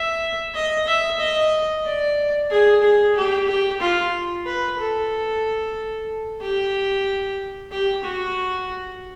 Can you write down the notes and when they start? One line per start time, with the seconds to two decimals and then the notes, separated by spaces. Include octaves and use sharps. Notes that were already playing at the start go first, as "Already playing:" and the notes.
Already playing: E5
0.55 D#5
0.87 E5
1.20 D#5
1.86 D5
2.51 G#4
2.83 G#4
3.15 G4
3.48 G4
3.80 F4
4.46 B4
4.79 A4
6.41 G4
7.71 G4
8.04 F#4